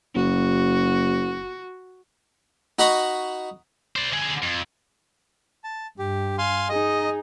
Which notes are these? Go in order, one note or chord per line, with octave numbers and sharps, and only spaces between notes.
F#1 F#4
D#4 F#4 D#5 A#5 B5 C#6
C5 D5
D3 G#4
F2
A5
G2 G4
F5 G#5 C6
D#4 G#4 D#5